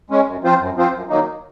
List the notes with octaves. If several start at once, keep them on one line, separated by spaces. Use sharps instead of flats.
G#3 C#4
F#2
F3 C4 F4 C5
F#2
F3 C4 F4 C5
F#2
D#3 F#3 A#3 D#4